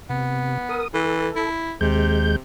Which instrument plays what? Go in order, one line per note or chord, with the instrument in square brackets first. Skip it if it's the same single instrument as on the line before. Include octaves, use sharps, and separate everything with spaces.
[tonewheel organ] C3 [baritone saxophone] B3
[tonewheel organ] A#4 D#6
[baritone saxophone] E3 [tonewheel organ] A4
[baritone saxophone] E4
[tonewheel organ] D#2 G#3 G6 [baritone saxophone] C3